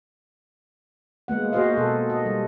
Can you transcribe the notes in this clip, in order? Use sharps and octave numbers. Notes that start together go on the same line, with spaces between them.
G#3 A#3 B3 F#5
A#3 F#4 G#4 C5 D#5 F5
B2 A4
D#5
G3